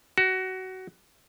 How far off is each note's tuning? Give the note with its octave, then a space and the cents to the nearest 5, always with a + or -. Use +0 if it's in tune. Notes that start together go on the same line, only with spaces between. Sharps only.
F#4 +20